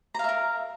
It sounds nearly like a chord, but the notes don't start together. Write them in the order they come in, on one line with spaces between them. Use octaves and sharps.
A#5 F5 E5 A#4